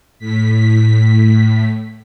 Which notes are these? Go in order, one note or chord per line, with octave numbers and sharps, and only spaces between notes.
A2 B6